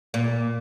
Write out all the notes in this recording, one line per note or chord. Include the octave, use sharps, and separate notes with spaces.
A#2